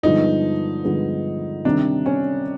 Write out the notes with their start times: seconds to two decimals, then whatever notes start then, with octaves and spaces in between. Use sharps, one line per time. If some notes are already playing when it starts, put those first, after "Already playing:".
0.03 G2 D3 F3 G#3 B3 D#4
0.84 G2 D3 F3 G#3 B3
1.65 C3 D#3 G3 C4 D4 D#4
2.06 C#4